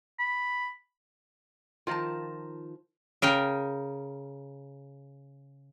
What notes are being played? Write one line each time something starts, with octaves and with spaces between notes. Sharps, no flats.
B5
D#3 F3 F4 A#4 A5
C#3 A#4 G5